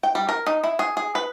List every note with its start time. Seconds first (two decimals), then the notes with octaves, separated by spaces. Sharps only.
0.03 G5
0.15 G3
0.29 A#4
0.46 D#4
0.64 E4
0.79 G#4
0.97 G#4
1.15 B4